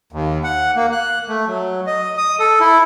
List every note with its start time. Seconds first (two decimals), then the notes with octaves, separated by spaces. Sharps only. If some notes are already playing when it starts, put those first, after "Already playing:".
0.12 D#2
0.44 F#5
0.76 A#3
0.92 F#6
1.28 A3
1.48 F#3
1.87 D#5
2.18 D#6
2.39 A4
2.61 E4